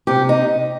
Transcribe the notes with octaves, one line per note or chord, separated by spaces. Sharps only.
C3 G4
D#4